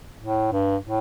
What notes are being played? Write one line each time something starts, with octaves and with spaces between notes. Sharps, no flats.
A2
G2
A2